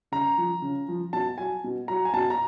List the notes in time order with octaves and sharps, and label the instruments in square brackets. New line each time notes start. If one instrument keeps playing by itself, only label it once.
[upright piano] C#3 A#5
F3
C#3
F3
B2 A5
F#3 G#5
B2
F#3 A#5
G#5
B2 A5
A#5